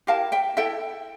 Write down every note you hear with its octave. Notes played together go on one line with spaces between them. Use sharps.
E4 G4 A#4 F5 A5
E5 G5
E4 A4 E5 G5